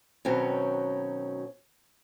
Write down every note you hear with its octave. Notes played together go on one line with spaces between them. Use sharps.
B2 D#3 F#3 C4 C#4